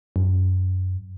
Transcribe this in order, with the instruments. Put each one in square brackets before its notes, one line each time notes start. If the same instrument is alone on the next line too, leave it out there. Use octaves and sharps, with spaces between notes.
[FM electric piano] F#2